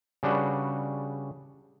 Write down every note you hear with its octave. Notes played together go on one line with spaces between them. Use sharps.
C#3 G3 D4 F#4 B4